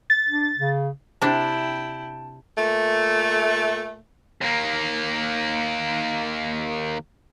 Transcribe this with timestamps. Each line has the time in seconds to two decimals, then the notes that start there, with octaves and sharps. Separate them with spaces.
0.10 A6
0.29 D4
0.57 C#3
1.22 C3 D4 E4 G5 A5
2.56 A#2 A3
4.41 D#2 A#3